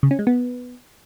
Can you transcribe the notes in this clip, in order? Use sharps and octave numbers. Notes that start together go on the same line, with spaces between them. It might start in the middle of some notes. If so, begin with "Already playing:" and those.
C#3
C#4
G#3
B3